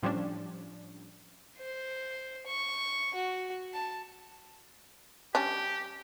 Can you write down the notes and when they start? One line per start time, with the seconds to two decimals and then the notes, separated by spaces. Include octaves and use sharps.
0.02 A2 F3 G3 C#4 D4
1.58 C5
2.47 C#6
3.15 F#4
3.74 A5
5.35 G3 C#4 D4 G4